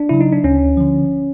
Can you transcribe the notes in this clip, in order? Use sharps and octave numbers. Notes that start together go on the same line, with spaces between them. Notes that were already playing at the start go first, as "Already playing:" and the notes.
Already playing: D4
C#3 F#3 E4
D#4
D4
D2 C#4
D3 F3